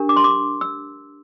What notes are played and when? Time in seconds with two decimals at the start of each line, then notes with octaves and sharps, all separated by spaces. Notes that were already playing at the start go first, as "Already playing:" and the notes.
Already playing: D4 G4 A#4
0.09 D6
0.16 C6
0.24 D6
0.61 E6